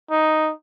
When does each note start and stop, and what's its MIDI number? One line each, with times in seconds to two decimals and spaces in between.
0.11 0.52 63